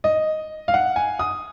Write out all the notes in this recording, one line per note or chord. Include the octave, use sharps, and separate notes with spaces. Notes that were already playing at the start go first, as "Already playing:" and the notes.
D#5
F5
F#5
G#5
D#6